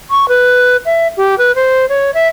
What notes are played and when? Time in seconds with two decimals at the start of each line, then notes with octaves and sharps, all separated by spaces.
0.10 C#6
0.29 B4
0.85 E5
1.17 G4
1.38 B4
1.55 C5
1.89 C#5
2.14 E5